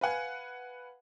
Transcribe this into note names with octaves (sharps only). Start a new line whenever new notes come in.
B4 F5 F#5 G#5